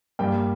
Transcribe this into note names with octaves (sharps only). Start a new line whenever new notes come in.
G2 G3 A#3 G5